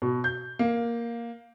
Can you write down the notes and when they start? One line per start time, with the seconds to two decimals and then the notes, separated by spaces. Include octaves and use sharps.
0.02 B2
0.24 G6
0.59 A#3